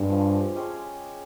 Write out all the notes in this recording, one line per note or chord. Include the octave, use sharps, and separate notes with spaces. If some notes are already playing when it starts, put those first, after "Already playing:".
Already playing: G2 G#3 C#4 G4
F3
G#3 C#4 G4